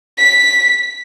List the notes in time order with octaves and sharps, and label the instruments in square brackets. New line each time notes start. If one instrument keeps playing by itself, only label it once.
[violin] B6